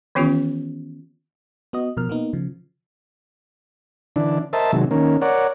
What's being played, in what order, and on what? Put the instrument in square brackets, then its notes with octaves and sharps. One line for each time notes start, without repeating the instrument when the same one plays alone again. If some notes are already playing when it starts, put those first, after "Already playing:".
[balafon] D#3 E3 B3 C#4 F4 G4
[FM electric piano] B3 F#4 D#5
B2 F3 A#4 F6
A#3 B3 D#4
C#3 F3
[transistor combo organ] D3 E3 D4
A#4 C5 D#5 E5 A5
C3 D#3 F#3 G#3
D#3 A#3 C#4
A#4 C#5 D5 F#5